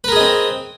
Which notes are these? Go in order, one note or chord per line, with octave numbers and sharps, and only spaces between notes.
C4 G#4 A#4 B4 D#5